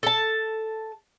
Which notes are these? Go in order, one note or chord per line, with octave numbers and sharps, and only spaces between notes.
A4 A5